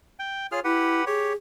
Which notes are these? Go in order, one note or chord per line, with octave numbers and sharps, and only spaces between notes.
G5
F4 G#4 C#5 F6
E4 G4 B4 F#5
G4 G#4 C#5